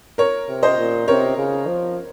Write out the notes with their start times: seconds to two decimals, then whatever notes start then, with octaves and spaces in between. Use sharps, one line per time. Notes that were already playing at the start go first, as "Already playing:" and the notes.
0.18 A#4 C#5
0.48 C3
0.63 C5 D#5
0.78 A#2
1.08 C3 A#4 C#5
1.38 C#3
1.67 F3